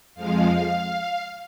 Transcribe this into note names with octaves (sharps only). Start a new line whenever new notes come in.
F2 F3 G#3 F5